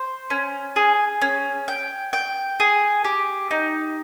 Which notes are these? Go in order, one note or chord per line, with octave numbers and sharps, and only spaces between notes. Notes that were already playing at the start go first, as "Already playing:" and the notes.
Already playing: C5
C#4
G#4
C#4
G5
G5
G#4
G4
D#4